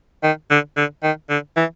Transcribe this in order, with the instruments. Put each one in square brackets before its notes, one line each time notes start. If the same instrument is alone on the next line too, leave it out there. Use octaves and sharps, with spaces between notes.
[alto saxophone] D#3
D3
D3
D#3
D3
E3